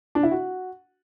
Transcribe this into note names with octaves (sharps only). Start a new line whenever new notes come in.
D4
E4
F#4